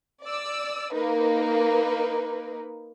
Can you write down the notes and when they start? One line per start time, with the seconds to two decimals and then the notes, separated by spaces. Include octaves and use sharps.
0.23 D5 E6
0.93 A#3 D#4 B4